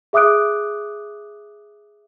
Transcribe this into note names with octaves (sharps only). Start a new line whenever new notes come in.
G#4 E5 D6 D#6 F#6 D7